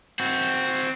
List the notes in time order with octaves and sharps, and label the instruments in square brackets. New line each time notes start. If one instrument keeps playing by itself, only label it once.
[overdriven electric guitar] C4 F#4